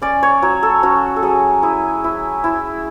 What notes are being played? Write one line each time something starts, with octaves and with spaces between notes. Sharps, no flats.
C#4 D5
C#5
F#3
A4
C#4 F#4
A4
F#3 G#4
E4 G#4
E4
E4